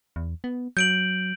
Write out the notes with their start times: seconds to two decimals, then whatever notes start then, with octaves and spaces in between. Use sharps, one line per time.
0.16 E2
0.44 B3
0.77 F#3 G6 D7 F#7